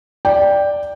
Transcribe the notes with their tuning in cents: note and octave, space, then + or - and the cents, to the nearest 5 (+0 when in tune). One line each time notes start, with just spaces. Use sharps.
D5 +0 G5 +0